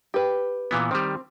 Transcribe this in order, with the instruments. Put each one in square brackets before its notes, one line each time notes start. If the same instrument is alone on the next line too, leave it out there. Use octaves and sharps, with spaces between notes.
[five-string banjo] G4 B4
[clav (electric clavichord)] A#2 E3 B3
[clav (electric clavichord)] D#3 G3 [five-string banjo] C4